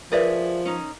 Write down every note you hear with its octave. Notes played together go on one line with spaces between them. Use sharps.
F3 G#4 A#4 B4 D5 E5
C#4 D#4